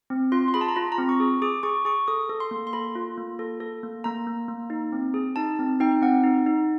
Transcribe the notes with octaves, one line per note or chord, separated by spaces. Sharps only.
C4
F4 C6
C6
G#4 B5
A5
A#5
F4 B5
A#5
C4
C#6
G#4
G#4 D6
G#4 C#6
G#4 C#6
A4 D#6
A4
C6
A#3
C6
A4 B5
F4
A#3
A4
A4
A#3
A#3 A#5
A#3
A#3
D#4
C4
G#4
D#4 A5
C4
D#4 G5
C4 F#5
D#4
D#4